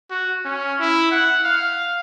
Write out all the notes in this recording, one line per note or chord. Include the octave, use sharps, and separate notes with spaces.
F#4
C#4
E4
F#5
F5